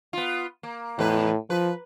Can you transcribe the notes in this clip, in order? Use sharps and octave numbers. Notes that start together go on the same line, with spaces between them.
B3 F4
A#3
E2 A2 B4
F3 B4